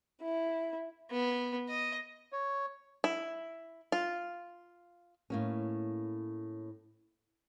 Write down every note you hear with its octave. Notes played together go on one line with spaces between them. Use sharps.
E4
B3
D#5
C#5
E4
F4
A2 A#3 C#4